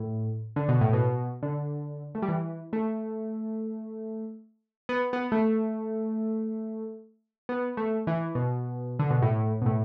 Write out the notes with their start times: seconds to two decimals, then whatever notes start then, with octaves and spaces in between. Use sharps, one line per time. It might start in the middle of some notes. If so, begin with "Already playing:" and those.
Already playing: A2
0.56 D3
0.68 B2
0.81 A2
0.93 B2
1.43 D3
2.15 A3
2.22 G3
2.29 E3
2.73 A3
4.89 B3
5.13 B3
5.32 A3
7.49 B3
7.77 A3
8.07 E3
8.35 B2
8.99 D3
9.10 B2
9.22 A2
9.62 B2
9.66 A2